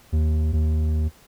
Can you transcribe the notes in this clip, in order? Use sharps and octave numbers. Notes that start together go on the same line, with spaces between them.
D#2
D#2